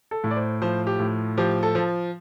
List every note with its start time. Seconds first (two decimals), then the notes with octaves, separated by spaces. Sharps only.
0.11 A4
0.24 A2
0.31 D5
0.36 C5
0.62 F3 C5
0.87 G4
0.99 A2
1.37 F3 G4
1.63 A4
1.75 F3